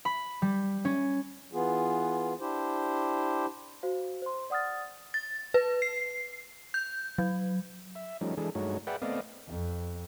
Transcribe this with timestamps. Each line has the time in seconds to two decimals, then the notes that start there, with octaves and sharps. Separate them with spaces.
0.05 B5
0.42 G3
0.85 C#4
1.53 E3 B3 F4 G#4
2.40 D4 E4 G4 C5
3.83 F#4 C5 F5
4.22 C5 C6
4.50 D5 F#5 D#6 F6 A6
5.14 A6
5.54 B4
5.82 C7
6.74 G6
7.18 F#3
7.95 E5
8.21 F3 G3 A3 C#4 D#4
8.37 E3 G#3 D4 G#4 A4
8.55 G2 G#3 A3 D#4 F#4 C#5
8.87 G#4 B4 D5 E5 F#5 G5
9.02 A3 B3 C4 D5 D#5 F5
9.47 F2